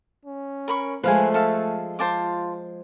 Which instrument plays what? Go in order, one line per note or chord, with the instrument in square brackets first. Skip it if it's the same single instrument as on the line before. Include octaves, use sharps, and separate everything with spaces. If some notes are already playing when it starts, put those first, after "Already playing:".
[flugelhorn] C#4
[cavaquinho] A#4 B5 C#6
[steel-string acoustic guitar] F3 G#3 [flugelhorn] A3 [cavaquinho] B4 F5 G#5
[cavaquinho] A4 E5 F5
[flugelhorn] F4 [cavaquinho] C5 A5 D6